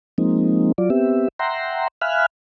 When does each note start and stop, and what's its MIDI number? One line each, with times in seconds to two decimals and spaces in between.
0.18 0.72 53
0.18 0.72 56
0.18 0.72 58
0.18 0.72 60
0.18 0.72 63
0.78 0.90 54
0.78 0.90 65
0.78 0.90 74
0.90 1.28 59
0.90 1.28 60
0.90 1.28 67
0.90 1.28 76
1.39 1.88 76
1.39 1.88 78
1.39 1.88 79
1.39 1.88 82
1.39 1.88 84
2.01 2.26 76
2.01 2.26 77
2.01 2.26 80
2.01 2.26 83
2.01 2.26 89
2.01 2.26 90